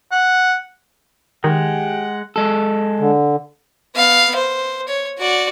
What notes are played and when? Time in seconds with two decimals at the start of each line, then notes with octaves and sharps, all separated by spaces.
0.11 F#5
1.44 D#3 G#3 G4 F#5
2.36 G#3 A4
3.00 D3
3.96 B3 F5
4.35 C5
4.88 C#5
5.19 F#4 D5